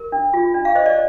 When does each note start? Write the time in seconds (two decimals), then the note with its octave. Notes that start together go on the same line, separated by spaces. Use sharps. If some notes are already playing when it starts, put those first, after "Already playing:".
Already playing: A#4
0.12 D4
0.33 F4
0.54 D4
0.65 F5
0.75 C5 D#5
0.86 D5